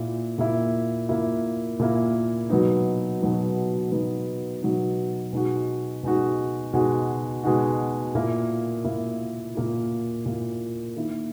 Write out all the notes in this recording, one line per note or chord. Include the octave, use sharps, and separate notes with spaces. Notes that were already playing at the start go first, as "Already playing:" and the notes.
Already playing: A#2 A#3 E4
A#2 A#3 E4
A#2 A#3 E4
A#2 A#3 E4
B2 F#3 B3 D#4
B2 F#3 B3 D#4
B2 F#3 B3 D#4
B2 F#3 B3 D#4
B2 G#3 D#4 F#4
B2 G#3 D#4 F#4
B2 G#3 D#4 F#4
B2 G#3 D#4 F#4
A#2 A#3 E4
A#2 A#3 E4
A#2 A#3 E4
A#2 A#3 E4
D#3 A#3 E4